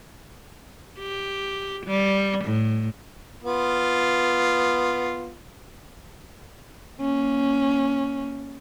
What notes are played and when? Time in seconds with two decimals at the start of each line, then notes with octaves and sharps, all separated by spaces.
0.98 G4
1.86 G3
2.45 A2
3.43 B3 F4
6.98 A#3 C#4